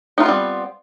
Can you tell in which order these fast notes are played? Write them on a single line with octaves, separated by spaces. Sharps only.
D#4 F4 B3 C4 G3